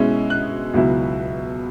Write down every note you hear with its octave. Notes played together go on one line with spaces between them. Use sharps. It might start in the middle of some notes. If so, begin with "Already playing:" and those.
Already playing: B2 G#3 C#4 E4
F#6
C#2 B2 F#3 E4